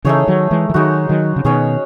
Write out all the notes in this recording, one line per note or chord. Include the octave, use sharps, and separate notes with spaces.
C#3 E3 A3 D#4 G#4 C#5
D#3 F#3
E3 G#3
E3
D#3 F#3 G#3 D#4 F#4
D#3 F#3
C#3
B2 D#3 C#4 G#4 C#5